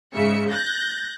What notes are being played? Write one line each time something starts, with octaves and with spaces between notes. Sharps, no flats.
G#2 C#3 E5 C#7
F#6 G6 A6 A#6